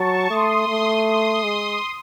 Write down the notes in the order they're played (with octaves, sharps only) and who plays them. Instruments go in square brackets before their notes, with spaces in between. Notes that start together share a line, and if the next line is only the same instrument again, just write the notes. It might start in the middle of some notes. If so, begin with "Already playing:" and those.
Already playing: [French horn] F#3 [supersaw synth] A5 C#6
[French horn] A3 [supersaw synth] C6 D#6
[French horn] A3
[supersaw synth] C6 D#6
[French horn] G#3